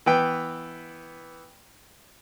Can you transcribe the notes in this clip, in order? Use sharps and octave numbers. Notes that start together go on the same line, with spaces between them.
E3 B3 G5